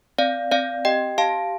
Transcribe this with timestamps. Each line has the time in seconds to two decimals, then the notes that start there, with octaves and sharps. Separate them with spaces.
0.18 C4 D5 F5
0.52 C4 D5 F5
0.85 G4 D#5 G5
1.18 G4 F5 A5